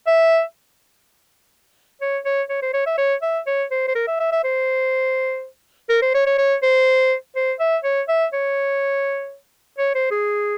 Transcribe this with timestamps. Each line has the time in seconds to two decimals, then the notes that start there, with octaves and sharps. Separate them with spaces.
0.07 E5
2.01 C#5
2.25 C#5
2.50 C#5
2.62 C5
2.74 C#5
2.86 E5
2.98 C#5
3.22 E5
3.47 C#5
3.71 C5
3.88 C5
3.95 A#4
4.07 E5
4.20 E5
4.32 E5
4.44 C5
5.89 A#4
6.02 C5
6.14 C#5
6.26 C#5
6.38 C#5
6.63 C5
7.36 C5
7.60 E5
7.84 C#5
8.08 E5
8.33 C#5
9.79 C#5
9.95 C5
10.11 G#4